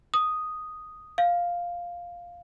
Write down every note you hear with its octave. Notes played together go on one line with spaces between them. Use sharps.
D#6
F5